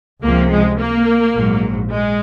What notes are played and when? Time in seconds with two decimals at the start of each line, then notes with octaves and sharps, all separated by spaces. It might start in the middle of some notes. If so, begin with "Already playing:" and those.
0.22 C#2 C3 F3 A#3
0.51 G#3
0.79 A#3
1.35 A#1 G#2 F#3
1.92 G#3